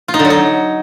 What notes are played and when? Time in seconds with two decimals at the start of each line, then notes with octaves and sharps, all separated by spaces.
0.08 F4
0.14 D#4
0.19 D3
0.25 F#3
0.30 D#4